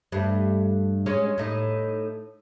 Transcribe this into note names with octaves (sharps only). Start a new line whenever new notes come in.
G2 A3
G#3 C#4 C#5
A2 D#4